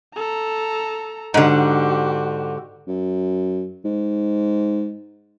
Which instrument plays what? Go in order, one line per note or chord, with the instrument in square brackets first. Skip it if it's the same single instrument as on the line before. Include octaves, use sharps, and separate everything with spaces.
[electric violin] A4 A#5
[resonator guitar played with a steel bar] G#2 D3 [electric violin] F#4 G4
[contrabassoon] F#2
G#2